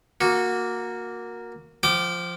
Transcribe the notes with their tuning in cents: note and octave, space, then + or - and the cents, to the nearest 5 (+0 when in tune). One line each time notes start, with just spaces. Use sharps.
A#3 +0 F#4 -20
F3 +0 G5 -35 D6 +15